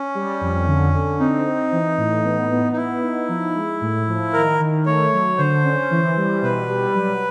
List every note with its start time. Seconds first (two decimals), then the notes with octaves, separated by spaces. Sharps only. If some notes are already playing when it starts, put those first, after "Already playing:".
Already playing: C#4
0.15 G3
0.41 F2
0.67 D3
0.93 D3
1.19 C4 D#4
1.46 C4
1.72 E3
1.98 A2
2.24 B3
2.51 B3
2.72 D#4
2.77 B3 E4
3.03 D#4
3.29 F3
3.55 G#3
3.81 A2
4.08 F3
4.33 D#3 A#4
4.60 D#3
4.85 A3 C#5
5.13 F#3
5.38 D3 C5
5.64 C#4
5.91 E3
6.17 G3
6.42 B2 B4
6.69 G3
6.95 F#3